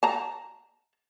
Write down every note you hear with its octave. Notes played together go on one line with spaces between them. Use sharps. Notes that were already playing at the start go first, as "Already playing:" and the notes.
A5 A#5